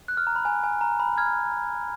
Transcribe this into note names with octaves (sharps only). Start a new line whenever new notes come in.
F#6
F6
A#5
B5
G#5
G#5
A#5
B5
F6 G#6